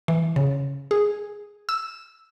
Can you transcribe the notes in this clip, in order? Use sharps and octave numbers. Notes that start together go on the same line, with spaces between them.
E3
C#3
G#4
E6